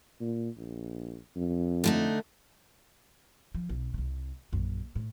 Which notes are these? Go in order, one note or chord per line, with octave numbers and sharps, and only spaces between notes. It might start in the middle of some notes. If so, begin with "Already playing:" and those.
A#2
A#1
F2
D3 A3 D#4
F3
B1
C2 C3
A#1 F#2
A2